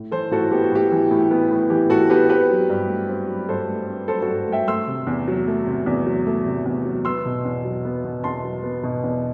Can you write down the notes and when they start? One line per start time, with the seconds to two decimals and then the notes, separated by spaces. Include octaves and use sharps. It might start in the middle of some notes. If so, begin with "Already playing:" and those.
Already playing: A2
0.11 E3 A4 C5
0.31 A2 F#4 A4
0.51 B3 G4
0.64 F#4
0.72 A2 G4
0.92 E3
1.11 A2
1.31 B3
1.51 A2
1.70 E3 G4
1.90 A2 F#4 A4
2.10 B3 G4 B4
2.29 C4 G4 B4
2.50 F#3
2.70 G2
2.89 A3
3.09 C4
3.28 F#3
3.49 G2 A4 C5
3.69 A3
3.88 C4
4.08 F#3 A4 C5
4.22 F#4 A4
4.28 G2
4.47 A3
4.52 E5 G5
4.68 A3 C6 E6
4.88 C3
5.07 E2
5.28 F#3
5.47 A3
5.67 C3
5.86 E2
6.06 F#3
6.27 A3
6.46 C3
6.66 E2
6.85 F#3
7.05 B3 C6 E6
7.26 B2
7.45 E2
7.64 F#3
7.85 B3
8.05 B2
8.24 E2 A5 C6
8.44 F#3
8.63 B3
8.84 B2
9.03 E2